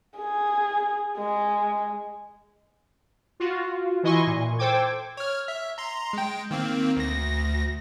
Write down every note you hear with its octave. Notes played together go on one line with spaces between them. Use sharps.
G#4
G#3
F4 F#4
E3 E4 D#5 G#5 C6 C#6
A#2
A4 C5 G5 D6 G#6
C#5 F6
E5
A#5 C6
G#3 G5
D#3 A#3 C4
D2 A#6